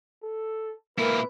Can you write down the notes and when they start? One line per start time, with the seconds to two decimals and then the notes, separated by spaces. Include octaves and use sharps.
0.24 A4
0.99 A#2 E4 A#4 B4